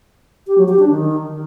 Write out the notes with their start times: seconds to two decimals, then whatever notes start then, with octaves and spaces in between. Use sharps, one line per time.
0.47 G4
0.58 F#3
0.68 G4
0.79 D4
0.90 D#3